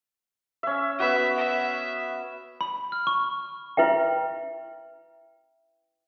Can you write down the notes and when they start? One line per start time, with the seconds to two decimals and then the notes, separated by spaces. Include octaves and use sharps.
0.63 C#4 E5
1.00 B3 F#4 E5
1.37 E5
2.61 B5
2.92 F6
3.07 C#6
3.77 E4 B4 E5 G5